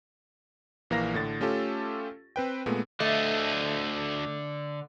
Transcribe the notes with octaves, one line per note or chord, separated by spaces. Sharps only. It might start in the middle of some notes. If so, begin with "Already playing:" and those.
A#1 E3 A#3 A#4 F5 A#6
A2 D3 A6
A3 C#4 F4 G4 A4
C4 B4 G5
A#2 G#3 A3 B3
D2 D3 A3 D#5